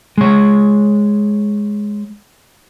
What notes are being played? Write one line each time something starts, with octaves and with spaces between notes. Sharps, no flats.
G#3 C#5